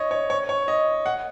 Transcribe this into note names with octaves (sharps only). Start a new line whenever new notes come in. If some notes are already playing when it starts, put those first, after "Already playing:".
Already playing: C#5 D#5
C#5
C#5
C#5
D#5
F#5